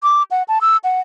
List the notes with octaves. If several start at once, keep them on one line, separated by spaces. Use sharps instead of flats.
D6
F#5
A5
E6
F#5